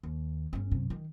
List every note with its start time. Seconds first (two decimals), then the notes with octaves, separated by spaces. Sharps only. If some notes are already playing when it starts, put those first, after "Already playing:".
0.03 D#2
0.53 G1 C#4
0.71 F#2 C3
0.90 D#3